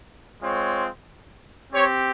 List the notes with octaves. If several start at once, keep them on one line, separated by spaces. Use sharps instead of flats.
G#3 C4 F4 C#5
C4 G4 C#5